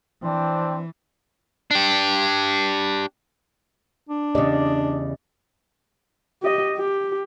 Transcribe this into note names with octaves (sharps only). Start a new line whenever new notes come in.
E3 C4 D4
D4 G4
D4
E2 C#3 G4 D5 D#5
G4 D#5
G4